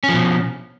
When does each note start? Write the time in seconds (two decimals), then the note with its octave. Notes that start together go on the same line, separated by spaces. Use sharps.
0.04 C#4
0.09 F3
0.14 B2